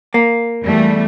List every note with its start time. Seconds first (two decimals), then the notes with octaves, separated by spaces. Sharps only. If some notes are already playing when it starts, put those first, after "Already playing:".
0.14 A#3
0.62 E2 G3 A3